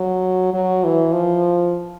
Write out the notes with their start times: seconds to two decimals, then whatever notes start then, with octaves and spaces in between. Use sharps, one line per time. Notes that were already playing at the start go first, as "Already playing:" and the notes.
Already playing: F#3
0.54 F#3
0.84 E3
1.12 F3